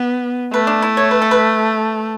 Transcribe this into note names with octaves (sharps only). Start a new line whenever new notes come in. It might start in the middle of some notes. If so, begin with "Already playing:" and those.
Already playing: B3
A3 B4
D4
E4
C#5
B4
A4
B4